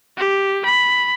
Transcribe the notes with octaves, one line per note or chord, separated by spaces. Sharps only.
G4
B5